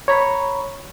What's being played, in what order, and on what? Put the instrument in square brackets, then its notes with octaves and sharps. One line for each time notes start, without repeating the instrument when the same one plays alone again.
[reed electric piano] C#5 A#5 B5 C#6